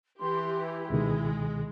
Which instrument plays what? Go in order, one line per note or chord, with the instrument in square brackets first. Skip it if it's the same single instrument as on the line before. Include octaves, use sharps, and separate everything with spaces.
[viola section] E3 G4 [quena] C6
[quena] E4
[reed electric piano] C#2 B2 D#3 [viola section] G#3